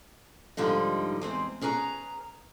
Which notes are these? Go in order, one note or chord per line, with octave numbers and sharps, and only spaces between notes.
G#2 D3 F3 G3 D#4
E2 G#3 C4
C#4 G#4 B4 A#5